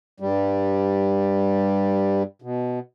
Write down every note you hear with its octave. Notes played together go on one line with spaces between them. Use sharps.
G2 G3
B2